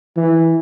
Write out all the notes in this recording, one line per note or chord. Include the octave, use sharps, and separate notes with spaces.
E3